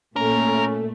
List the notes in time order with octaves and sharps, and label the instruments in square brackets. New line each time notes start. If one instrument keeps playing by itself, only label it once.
[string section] A#2 A3 [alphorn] C#4 [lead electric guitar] A#4